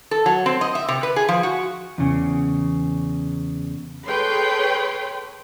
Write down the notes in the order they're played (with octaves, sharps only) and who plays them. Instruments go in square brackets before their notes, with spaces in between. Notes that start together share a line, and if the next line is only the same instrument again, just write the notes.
[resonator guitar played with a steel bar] A4
F#3
C4
D#5
E5
C3
B4
G#4
F3
F#4
[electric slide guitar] E2 C#3
[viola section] G#4 A4 B4 C#5 G5 C6